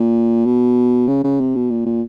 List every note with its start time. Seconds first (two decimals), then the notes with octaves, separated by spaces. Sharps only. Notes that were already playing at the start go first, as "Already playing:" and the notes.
Already playing: A#2
0.46 B2
1.08 C#3
1.24 C#3
1.40 C3
1.55 B2
1.71 A#2
1.86 A#2